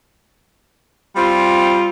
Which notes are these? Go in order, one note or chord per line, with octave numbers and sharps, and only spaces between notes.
G3 C4 F4